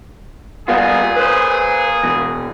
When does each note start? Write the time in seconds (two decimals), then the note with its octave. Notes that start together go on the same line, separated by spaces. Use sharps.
0.68 A#2 G3 B3 F4 G#4
1.16 B4 C5
2.04 B2 E3